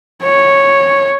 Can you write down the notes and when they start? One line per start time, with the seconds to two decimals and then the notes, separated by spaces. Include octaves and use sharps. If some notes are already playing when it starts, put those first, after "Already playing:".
0.23 C#5